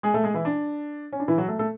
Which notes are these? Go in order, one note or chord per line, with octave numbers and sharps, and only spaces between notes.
G#3 G#4
A3 A4
G#3 G#4
E3 E4
D4
C#4
D4
E3 E4
F#3 F#4
A3 A4
A3 A4